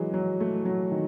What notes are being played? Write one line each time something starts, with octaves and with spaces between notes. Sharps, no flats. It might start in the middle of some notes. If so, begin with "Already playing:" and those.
Already playing: E3 F#3 G#3
F#3
A3
F#3
D#3